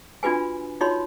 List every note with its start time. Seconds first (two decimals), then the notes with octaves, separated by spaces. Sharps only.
0.23 D4 F4 F#4 B4 G#5
0.81 D#4 F4 F#4 C#5 C6